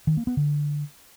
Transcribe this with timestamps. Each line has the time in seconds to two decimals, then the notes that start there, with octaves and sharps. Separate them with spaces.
0.07 D#3
0.17 A#3
0.27 B3
0.37 D3